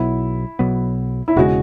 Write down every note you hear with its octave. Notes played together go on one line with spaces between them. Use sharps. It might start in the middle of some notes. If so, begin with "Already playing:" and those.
Already playing: B1 B2 F#3 B3 E4
B1 B2 F#3 B3
E4
E1 C#3 G#3 F#4